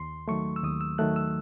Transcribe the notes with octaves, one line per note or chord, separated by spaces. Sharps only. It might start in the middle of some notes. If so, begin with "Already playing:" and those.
Already playing: D#2 C6
D#3 F#3 A3 C#6
E6
D#2 D#6
E6
D#3 F#3 A3 F#6
E6